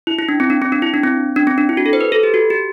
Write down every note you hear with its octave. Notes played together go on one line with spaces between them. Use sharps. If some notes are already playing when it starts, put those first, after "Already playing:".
E4
E4
D4
C4
D4
C4
D4
E4
D4
C4
D4
C4
D4
E4
F#4
A4
C5
B4
A4
G4
F#4
G4